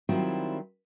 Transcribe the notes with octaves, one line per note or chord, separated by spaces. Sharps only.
D#3 F#3 G3 C4 E4 F4